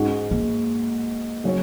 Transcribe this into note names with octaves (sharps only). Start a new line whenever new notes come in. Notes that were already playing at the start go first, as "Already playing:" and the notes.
Already playing: G#2 G#3 C#4 F#4
A#3
C#3 F#3 C#4